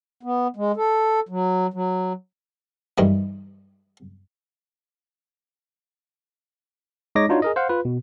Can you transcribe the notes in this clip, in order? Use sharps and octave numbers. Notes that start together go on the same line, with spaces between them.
B3
G#3
A4
F#3
F#3
G2 D#3 E3
G#3 D#4 C#5 D#5 D6 A#6
D4 D#4 F4 F#4 C#5
G#4 A#4 D#5
C5 F5 F#5
F4 B4
B2